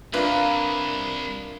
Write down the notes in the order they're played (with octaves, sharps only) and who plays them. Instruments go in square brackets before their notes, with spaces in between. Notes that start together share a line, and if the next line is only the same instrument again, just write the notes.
[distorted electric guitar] C2 [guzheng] A#3 A#4 [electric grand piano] D4 F4 E5 [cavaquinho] B4